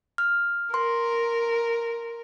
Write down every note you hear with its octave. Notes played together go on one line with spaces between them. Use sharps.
F6
A#4 C6